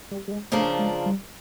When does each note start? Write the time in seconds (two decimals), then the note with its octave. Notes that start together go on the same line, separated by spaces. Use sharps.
0.11 G3
0.28 G3
0.31 G#3
0.52 C#3 F3 A3 A#3 D4 F4
0.79 G#3
1.06 G3